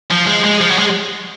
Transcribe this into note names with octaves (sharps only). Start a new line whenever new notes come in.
F3
G#3
G#3
F3
F#3
G#3